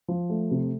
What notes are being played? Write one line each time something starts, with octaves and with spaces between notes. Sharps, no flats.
F3
A3
C3